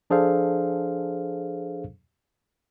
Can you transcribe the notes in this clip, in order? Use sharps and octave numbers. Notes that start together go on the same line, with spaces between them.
F3 D4 G#4 A4 C5 F5